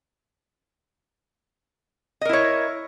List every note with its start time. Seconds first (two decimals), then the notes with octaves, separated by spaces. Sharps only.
2.21 D#5
2.25 A#4
2.29 E4
2.33 C#5